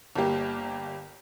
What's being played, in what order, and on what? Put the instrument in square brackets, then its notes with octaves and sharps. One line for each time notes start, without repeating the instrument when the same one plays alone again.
[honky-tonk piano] G1 G3 A#3 G4